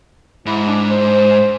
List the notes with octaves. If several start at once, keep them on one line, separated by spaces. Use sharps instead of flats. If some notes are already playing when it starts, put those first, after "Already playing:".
G#2 E4
D4
C5